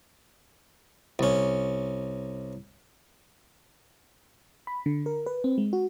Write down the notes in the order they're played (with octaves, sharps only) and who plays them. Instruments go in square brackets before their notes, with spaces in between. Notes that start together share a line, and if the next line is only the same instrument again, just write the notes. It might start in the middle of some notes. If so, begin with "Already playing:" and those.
[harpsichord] C2 C#4
[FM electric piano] B5
D3
A#4
B4
C4
G#3
F#4